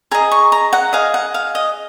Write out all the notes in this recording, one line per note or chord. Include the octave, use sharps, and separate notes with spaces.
G#4 D#5 A#5
C#6
A#5
F#5
G#4 D#5 F5
F#5
F5
D#5